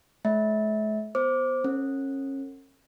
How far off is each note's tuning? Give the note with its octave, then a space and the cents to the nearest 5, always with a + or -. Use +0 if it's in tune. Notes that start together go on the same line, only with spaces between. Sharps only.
A3 -45 E5 -30
B3 +0 C5 +0 D6 -5
C#4 -30 A#4 -45